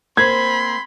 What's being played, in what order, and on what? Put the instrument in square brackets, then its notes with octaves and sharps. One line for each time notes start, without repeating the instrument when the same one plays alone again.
[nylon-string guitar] A#3 C5 [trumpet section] C4 C6 [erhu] B5 [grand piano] G#6